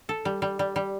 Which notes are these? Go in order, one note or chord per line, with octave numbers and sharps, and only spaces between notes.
A4
G3
G3
G3
G3